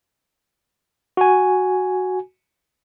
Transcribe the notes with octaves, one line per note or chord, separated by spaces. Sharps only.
F#4 G#5